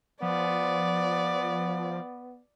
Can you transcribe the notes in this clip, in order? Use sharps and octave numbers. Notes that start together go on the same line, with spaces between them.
F3 B3 D5